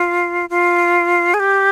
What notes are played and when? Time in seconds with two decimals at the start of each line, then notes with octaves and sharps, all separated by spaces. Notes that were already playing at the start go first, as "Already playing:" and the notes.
Already playing: F4
0.50 F4
1.34 G#4
1.40 G4